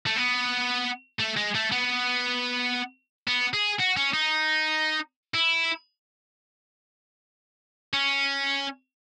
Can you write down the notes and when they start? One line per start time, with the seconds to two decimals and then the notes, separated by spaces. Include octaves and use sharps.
0.06 A3
0.16 B3
1.20 A3
1.37 G#3
1.55 A3
1.72 B3
3.28 B3
3.54 G#4
3.80 F#4
3.97 C#4
4.14 D#4
5.34 E4
7.93 C#4